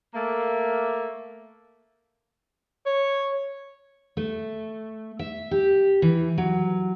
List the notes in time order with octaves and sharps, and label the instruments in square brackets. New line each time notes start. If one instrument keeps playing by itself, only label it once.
[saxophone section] A3 A#3
[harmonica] C#5
[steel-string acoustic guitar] A3
E5
G4
E3
F#3